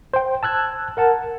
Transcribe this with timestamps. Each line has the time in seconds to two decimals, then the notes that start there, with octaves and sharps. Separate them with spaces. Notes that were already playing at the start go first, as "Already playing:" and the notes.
0.14 C5 G5
0.43 A5 E6 F#6 G#6
0.97 A#4 F#5 A5